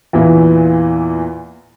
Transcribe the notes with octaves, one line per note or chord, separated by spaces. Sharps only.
E2 A#2 E3